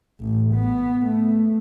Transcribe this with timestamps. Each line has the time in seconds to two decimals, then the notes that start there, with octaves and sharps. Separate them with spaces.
0.21 A1
0.55 B3
1.06 A3